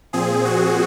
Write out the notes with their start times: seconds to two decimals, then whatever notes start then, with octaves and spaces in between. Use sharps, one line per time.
0.13 A#2 F3 C4 G#4
0.45 F#4